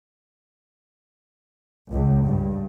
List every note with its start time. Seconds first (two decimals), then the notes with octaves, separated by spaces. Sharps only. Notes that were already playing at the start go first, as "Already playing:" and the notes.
1.91 C#2
2.25 G2